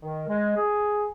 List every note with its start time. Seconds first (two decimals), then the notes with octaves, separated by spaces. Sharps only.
0.01 D#3
0.28 G#3
0.56 G#4